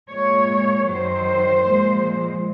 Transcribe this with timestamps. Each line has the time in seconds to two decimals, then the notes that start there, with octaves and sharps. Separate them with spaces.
0.10 A#2 G#3 C#5
0.89 F#2 D#3 F#3 C5
1.67 A#2 F3 G#3